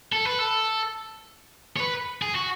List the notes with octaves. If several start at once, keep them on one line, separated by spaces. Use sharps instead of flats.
A4
B4
A4
C#5
B4
G#4
F#4